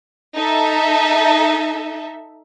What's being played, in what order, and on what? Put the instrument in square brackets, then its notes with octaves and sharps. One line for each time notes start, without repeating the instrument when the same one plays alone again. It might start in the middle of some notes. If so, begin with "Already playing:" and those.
[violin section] D#4 A4 E5